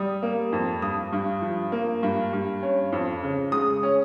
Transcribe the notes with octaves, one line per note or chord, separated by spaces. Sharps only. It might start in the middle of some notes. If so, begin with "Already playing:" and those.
Already playing: G3 D#6
A#3
F2
G2 D#6
G2
F3
A#3
G2
G2
C#4
F2
C#3
G#3 D#6
C#4